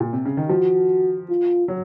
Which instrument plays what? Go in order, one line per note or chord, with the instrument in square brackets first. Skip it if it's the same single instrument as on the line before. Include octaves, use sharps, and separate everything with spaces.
[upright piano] A#2
C3
C#3
D#3
[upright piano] F3 [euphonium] F#4
[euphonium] F4
[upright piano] F#3